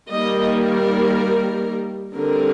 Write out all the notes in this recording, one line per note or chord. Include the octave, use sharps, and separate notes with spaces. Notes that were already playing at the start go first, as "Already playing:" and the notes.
D#3 G3 A#3 D#5
A#4
D3 G3 C4 A#4